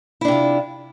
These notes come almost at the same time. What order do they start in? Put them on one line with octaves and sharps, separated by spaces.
E4 D4 C3 F4